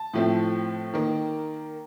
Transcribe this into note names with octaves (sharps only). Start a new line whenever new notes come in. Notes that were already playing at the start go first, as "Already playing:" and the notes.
Already playing: A5
A2 F3 A3 C4
D#3 A#3